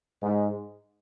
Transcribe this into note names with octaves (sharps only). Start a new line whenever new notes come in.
G#2